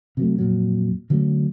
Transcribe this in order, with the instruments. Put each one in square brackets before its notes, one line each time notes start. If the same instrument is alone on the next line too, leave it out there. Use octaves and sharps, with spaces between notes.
[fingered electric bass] C3 F#3 A3
F2 A#2 F#3
D3 F#3 A3 C#4